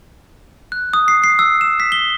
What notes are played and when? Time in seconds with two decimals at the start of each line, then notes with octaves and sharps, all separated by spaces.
0.72 F#6
0.93 D#6
1.08 C7
1.24 C7
1.39 E6
1.61 E7
1.80 B6
1.92 G7